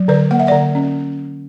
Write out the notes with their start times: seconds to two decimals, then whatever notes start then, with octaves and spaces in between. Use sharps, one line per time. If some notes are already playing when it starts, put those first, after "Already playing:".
Already playing: F#3
0.08 D3 B4 D5
0.31 A#3 F#5
0.39 E5
0.47 D3 D5 F#5
0.75 C#4